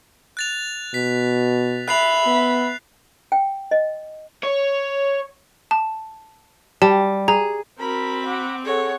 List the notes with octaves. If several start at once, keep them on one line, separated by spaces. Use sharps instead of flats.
F#6 A6 F7
B2 B6
E5 B5 F#6 C7 F7
B3
G5
D#5
C#5
A5
G3 A5
G#4 A#5
C4 F#4 A#4 B5
F#5 D6
G#4 A4 C#5 F#5